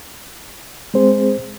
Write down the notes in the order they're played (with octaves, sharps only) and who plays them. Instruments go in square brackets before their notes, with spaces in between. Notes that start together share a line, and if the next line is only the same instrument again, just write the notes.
[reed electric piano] G#3 C4 G#4 C5